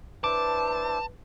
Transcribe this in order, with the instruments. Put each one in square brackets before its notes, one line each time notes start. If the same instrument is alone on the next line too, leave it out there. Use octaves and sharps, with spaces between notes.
[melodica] D4 E4 C5 [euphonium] B4 [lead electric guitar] A5 [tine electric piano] D6